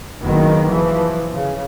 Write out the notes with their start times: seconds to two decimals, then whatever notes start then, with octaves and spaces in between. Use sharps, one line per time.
0.23 F#1 D#3 B3
0.70 E3 F3
1.34 C#3